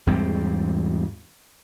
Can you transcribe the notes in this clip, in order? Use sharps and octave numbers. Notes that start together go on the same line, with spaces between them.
E2 G#2 G3 C4